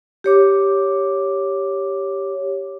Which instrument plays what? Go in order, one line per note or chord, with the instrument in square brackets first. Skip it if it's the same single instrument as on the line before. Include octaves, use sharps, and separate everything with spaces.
[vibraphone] G4 C#5 D6